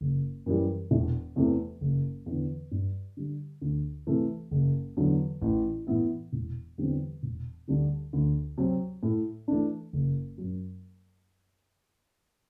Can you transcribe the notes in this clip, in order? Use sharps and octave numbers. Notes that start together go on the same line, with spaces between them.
F#1
F#2 E3 G3
E1
E2 C3 E3 A3
F#1
E2 D3
G2
D3 G3
D2
C3 E3 A3
F#1
E2 D3 F#3
A1
A2 E3 B3 E4
E1
E2 D3 G3 C4
E1
D2 D3 G3 D4
D2
C3 F#3 C4
A2
E3 A3 D4
F#1
F#2 F#3